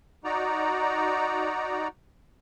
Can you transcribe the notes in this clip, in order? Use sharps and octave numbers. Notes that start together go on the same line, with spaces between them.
D#4 F#4 D5 A#5